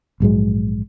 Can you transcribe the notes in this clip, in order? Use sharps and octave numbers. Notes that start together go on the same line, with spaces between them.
A#1 G#2 F#3 G#3